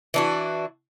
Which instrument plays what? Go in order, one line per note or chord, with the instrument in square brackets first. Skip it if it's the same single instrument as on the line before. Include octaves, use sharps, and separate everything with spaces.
[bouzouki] E3 D4 F#4